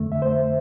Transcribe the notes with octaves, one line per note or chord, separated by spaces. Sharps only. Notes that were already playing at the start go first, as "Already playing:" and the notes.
Already playing: F2 D3 A3
E5
C5